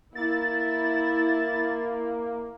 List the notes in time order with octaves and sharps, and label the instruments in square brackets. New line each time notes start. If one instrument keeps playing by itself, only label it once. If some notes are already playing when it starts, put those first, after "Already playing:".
[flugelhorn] A#3 [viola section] E4 [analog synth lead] A6